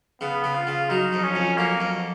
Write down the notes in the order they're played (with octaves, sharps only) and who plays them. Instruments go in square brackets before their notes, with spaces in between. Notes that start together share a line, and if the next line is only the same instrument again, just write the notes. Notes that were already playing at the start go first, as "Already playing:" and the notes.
[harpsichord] C#3 [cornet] B3
[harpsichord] C#3
[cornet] F4
[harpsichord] C#3
[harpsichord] F#3 [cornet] D#4
[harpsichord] F2
[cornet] C#4
[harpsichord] F2
[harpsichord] F#3 [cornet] A#3
[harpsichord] F2